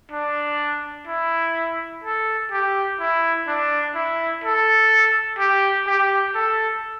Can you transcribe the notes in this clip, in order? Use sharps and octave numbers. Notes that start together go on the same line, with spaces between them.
D4
E4
A4
G4
E4
D4
E4
A4
G4
G4
A4